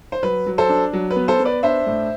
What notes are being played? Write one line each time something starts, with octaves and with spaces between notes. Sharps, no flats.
C5
F#3 B4
F#3
A4 C5
D4
F#3
B4
B3
A4 C5
B3
B4 D5
D4 C5 E5
A2